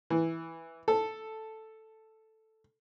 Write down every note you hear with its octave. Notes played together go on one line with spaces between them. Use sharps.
E3
A4